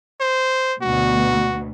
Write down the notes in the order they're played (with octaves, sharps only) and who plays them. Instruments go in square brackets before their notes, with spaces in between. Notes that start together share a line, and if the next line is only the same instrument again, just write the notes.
[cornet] C5
[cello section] D2 B2 [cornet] F#4